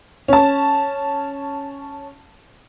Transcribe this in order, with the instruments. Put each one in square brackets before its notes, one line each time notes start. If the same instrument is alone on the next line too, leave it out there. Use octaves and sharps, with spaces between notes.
[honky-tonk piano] C#4 A5